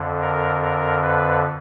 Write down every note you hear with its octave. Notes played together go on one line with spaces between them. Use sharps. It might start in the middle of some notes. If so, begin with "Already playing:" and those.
Already playing: F2 D3
A#4
A#4
B4